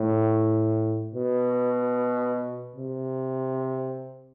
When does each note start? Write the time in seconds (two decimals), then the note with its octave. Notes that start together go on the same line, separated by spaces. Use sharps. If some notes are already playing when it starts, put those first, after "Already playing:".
Already playing: A2
1.15 B2
2.76 C3